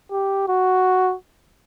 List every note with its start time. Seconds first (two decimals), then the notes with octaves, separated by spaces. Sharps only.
0.11 G4
0.48 F#4